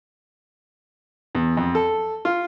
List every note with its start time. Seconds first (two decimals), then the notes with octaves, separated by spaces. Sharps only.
1.35 E2
1.57 F2
1.75 A4
2.25 F4